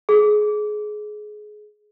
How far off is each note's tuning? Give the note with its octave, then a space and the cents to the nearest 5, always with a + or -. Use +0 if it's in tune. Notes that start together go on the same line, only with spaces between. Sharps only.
G#4 +20